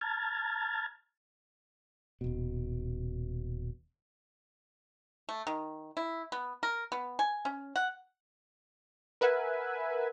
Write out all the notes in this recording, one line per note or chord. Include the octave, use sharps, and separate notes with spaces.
A5 A#5 F6 G#6 A6
D#1 B2
A3
D#3
E4
B3
A#4
B3
G#5
C#4
F#5
A#4 B4 E5 F#5 G#5